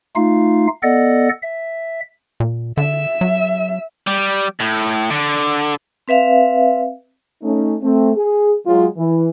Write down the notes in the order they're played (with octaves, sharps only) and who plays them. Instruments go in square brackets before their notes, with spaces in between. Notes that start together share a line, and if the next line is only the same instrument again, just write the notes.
[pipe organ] A3 D#4 F4 F5
B3 A4 D5 D#5 F#5
E5
[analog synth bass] A#2
[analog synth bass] D3 [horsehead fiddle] E5
[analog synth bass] F#3
[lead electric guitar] G3
A2
D3
[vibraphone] C4 B4 E5 F5
[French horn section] A3 C#4 D#4
A3 C4
G#4
F#3 G#3 F4
E3